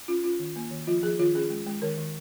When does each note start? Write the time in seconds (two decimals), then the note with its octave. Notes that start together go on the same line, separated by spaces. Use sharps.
0.08 C#4 F4
0.24 C#4 F4
0.39 D#3
0.56 A#3
0.71 D#3
0.87 F3 F4
1.03 F3 G#4
1.19 D#3 F4
1.35 C#4 G#4
1.50 G#3
1.67 G#3
1.82 D#3 A#4
1.97 D#3